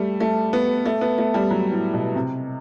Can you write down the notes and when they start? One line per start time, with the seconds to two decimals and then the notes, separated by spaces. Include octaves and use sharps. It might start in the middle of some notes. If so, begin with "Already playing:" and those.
Already playing: G3 A3
0.20 A3
0.53 B3
0.85 A3
1.01 B3
1.18 A3
1.34 G3
1.51 F#3
1.71 A2
1.93 B2
2.15 C3